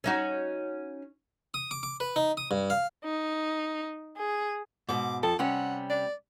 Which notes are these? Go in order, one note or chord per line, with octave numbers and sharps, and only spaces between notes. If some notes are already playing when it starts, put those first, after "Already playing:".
C#4 D#4 F#4
D#6
D6
D6
B4
D#4
D#6
G2
F5
D#4
G#4
G#2 B2 D6
F2 A4
C3 G3 C#4 F#5
D5